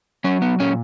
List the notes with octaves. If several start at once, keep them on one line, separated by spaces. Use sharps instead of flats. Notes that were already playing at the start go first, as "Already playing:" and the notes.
F#3 C#4
B3
A#2 C#4